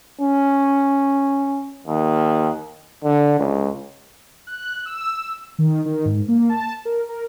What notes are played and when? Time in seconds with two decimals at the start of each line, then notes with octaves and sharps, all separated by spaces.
0.21 C#4
1.87 D#2
3.04 D3
3.40 C#2
4.47 F#6
4.86 E6
5.58 D#3
5.85 D#3
6.05 G#2
6.28 A#3
6.49 A5
6.85 A#4
7.09 A#4